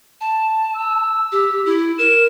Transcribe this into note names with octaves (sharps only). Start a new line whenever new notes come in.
A5
E6
G4
E4
A#4 E7